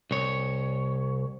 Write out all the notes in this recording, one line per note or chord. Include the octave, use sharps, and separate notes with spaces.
C2 C#5